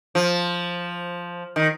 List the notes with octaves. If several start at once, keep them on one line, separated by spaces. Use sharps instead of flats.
F3
D#3